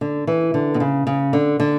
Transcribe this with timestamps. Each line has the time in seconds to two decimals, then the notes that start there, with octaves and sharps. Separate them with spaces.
0.01 D3
0.27 E3
0.54 D3
0.74 B2
0.80 C#3
1.07 C#3
1.33 D3
1.60 D3